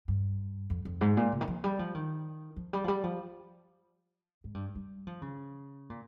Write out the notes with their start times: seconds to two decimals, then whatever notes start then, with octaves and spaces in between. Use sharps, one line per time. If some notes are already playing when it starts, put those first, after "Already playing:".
0.08 G2
0.70 F2
0.85 F2
1.01 G#2
1.17 A#2
1.32 C#3
1.41 D#3
1.48 F3
1.64 G3
1.79 F3
1.95 D#3
2.56 F3
2.73 G3
2.84 F3
2.88 G3
3.04 F3
4.44 G#2
4.54 G2
4.75 G3
5.07 F3
5.22 C#3
5.90 A#2